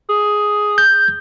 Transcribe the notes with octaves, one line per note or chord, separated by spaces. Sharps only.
G#4
G6